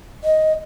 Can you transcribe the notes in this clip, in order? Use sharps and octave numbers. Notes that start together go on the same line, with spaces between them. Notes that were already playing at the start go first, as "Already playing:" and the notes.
D#5